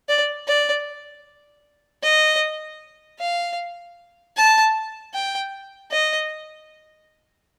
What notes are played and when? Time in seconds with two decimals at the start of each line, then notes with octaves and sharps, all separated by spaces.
0.09 D5
0.48 D5
2.03 D#5
3.20 F5
4.37 A5
5.14 G5
5.92 D#5